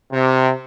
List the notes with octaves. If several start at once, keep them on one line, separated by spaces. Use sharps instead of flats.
C3